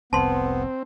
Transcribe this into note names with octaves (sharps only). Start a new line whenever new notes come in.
F1 C2 B3 C4 A5 C6